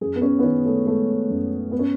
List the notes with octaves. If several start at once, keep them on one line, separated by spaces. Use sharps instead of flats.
F#2 G#4
B3
C#4
B3
D#3 C#4
A3
G#3 A3
F#2
B3
C#4